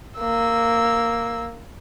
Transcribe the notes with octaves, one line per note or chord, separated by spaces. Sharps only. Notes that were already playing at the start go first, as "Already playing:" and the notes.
A#3 E6